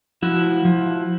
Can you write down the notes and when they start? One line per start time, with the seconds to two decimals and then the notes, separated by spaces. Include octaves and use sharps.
0.22 F3 E4 F#4
0.65 F3